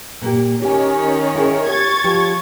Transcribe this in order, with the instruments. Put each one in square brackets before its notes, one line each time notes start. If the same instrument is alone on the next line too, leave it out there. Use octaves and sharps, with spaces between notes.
[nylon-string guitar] A#2 A#3 G4
[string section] D#3 C#4 [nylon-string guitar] G4 G#5
[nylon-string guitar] E4 G#4
[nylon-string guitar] G4 [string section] C#6 G#6 A6
[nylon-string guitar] F3 G4 C#5